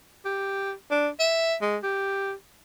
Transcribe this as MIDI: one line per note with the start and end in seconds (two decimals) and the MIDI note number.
0.25 0.73 67
0.91 1.09 62
1.20 1.55 76
1.61 1.77 56
1.83 2.33 67